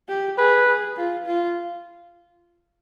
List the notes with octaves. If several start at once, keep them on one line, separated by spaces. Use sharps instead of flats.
G4
G#4 B4
G#4
F4
F4